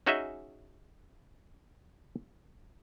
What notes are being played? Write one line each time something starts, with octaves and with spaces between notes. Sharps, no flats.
C#4 D#4 F#4 G#4 D#5 E5